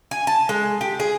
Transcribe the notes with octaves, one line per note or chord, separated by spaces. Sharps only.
G#5
A5
G#3
G4
G#4